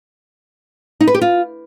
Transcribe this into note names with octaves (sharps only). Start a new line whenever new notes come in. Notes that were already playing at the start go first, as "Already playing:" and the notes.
D#4
B4
G4
F4